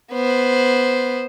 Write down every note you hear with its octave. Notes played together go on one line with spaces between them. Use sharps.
B3 C5